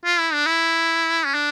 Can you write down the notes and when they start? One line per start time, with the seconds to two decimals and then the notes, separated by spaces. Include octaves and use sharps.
0.05 F4
0.19 E4
0.34 D4
0.46 E4
1.26 C#4
1.34 D4